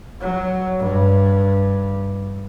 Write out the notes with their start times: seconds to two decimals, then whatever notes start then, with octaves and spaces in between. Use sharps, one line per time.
0.21 F#3
0.79 G2